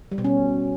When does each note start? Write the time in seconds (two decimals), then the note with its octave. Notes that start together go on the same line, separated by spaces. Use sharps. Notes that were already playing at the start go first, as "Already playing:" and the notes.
0.12 G3
0.18 B2
0.24 C#4